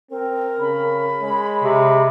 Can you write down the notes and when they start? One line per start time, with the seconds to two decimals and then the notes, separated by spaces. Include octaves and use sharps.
0.11 C4 A#4
0.60 C#3 B5
1.22 G#3 C#5
1.64 C3